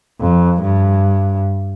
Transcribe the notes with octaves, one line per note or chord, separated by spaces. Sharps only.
F2
G2